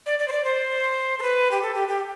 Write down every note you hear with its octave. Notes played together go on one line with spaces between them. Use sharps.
D5
D5
C5
D5
C5
A4
B4
G4
A4
G4
G4